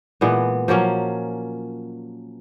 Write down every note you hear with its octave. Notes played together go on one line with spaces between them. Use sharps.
A#2 E3 G#3 B3
F3 F#3 A#3 C#4